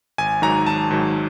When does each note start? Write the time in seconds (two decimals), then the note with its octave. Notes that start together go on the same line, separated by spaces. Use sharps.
0.18 G#1 G#5
0.42 G#2 D#3 F#3 A#5
0.67 G#1 A5
0.91 G#2 D#3 F#3